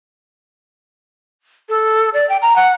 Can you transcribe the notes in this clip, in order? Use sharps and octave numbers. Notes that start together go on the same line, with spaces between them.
A4
D5
G5
A#5
F#5